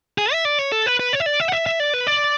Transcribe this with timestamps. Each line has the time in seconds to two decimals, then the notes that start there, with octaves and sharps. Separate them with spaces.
0.18 G#4
0.32 E5
0.45 D5
0.59 C#5
0.72 A4
0.86 B4
1.00 B4
1.13 C#5
1.20 E5
1.26 D5
1.40 E5
1.48 F#5
1.53 E5
1.66 E5
1.80 D5
1.94 B4
2.07 D5